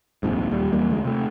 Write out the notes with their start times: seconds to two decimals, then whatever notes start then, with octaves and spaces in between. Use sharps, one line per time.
0.23 D#1 A#1 F2 G#2
0.50 D#1 D#2 G3
0.73 E2 G3 A#3
0.90 D2 G#3
1.05 C3 A3